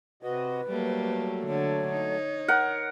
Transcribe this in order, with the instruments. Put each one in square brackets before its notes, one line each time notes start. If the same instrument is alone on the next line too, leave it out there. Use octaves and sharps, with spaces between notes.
[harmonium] C3 F#4 D#5 [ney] B4
[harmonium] F#3 A3 [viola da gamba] G3 A#3
[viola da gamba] D3 [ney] C#5
[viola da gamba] D#4
[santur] A#4 F#5